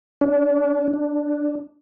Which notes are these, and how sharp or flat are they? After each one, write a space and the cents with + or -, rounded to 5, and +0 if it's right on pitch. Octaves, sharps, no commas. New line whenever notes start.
D4 -35
D4 +0